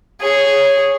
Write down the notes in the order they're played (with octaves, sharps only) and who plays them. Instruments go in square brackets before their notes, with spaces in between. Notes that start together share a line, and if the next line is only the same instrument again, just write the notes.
[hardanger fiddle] G#4 C#5